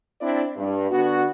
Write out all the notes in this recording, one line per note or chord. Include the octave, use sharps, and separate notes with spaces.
C4 D4 E4 D5
G2
D3 B3 F#4